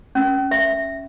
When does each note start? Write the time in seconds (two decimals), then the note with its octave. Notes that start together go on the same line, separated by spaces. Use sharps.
0.15 C#4
0.51 E5